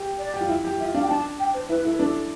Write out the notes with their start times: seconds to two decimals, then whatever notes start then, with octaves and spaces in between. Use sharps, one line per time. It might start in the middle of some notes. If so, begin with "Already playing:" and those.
Already playing: G4
0.18 D5
0.34 G4
0.41 F4
0.49 E4
0.64 G4
0.78 F4 E5
0.94 D4 F5
1.02 G5
1.09 D4 A5
1.39 G5
1.54 C5
1.69 E4 B4
1.84 E4 A4
1.93 B4
1.99 D4 A4